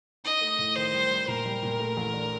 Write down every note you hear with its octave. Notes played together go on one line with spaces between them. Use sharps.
D#4 D#5
A3
A2
D#3 C5
G3
G3
A#2 A#4
G3
A#2
A3
A1
D4